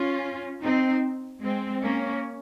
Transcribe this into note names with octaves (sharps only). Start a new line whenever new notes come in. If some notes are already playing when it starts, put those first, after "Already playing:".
Already playing: C#4 F4
C4 D#4
G#3 C4
A#3 C#4